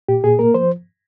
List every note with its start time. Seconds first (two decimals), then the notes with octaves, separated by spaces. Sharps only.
0.09 A#2 G4
0.24 A#2 G#4
0.39 A#3 A#4
0.54 F3 C5